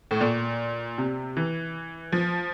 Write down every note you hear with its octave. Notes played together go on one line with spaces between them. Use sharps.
A2
A#2
C3
E3
F3